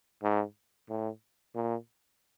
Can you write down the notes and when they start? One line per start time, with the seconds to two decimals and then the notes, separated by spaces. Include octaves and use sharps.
0.23 G#2
0.89 A2
1.55 A#2